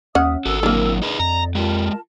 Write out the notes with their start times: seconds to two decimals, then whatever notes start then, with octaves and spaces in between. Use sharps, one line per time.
0.15 D#2 C#4 E5 F#5 D#6
0.46 G#1 F#4 A4 A#4 E6
0.63 F#3 A#3 C4 D4 E4
1.02 D#4 G#4 B4 D5 D#5
1.19 F2 A#5
1.55 G#3 F4 G4 A#4 A5